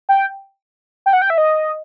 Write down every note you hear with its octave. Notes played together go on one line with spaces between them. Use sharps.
G5
G5
F#5
G5
E5
D#5